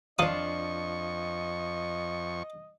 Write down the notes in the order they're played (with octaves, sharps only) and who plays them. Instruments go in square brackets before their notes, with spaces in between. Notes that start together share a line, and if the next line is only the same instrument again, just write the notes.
[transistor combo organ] F2 C#6 [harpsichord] F3 D#6 [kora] D4 F4 [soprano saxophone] D#5